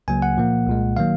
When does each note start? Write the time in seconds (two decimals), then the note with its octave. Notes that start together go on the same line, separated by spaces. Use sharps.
0.08 C#2 C#3 F#3 A#3 G#5
0.22 F#5
0.37 A#2 F3 A#3
0.67 C2 A#2 G#3
0.97 D#3 F#3 A#3 F5